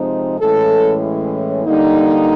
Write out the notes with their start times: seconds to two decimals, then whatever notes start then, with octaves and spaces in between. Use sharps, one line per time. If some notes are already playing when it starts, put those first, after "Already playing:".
Already playing: C3 F3 G#3 C4 D#4
0.40 A2 E3 G#3 C#4 A4
1.65 D3 G3 A#3 D#4